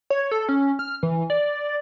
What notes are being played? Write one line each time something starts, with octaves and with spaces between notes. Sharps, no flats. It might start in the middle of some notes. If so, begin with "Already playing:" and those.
C#5
A4
C#4
F6
E3
D5